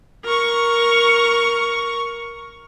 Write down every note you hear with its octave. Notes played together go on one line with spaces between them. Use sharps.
A#4 C#6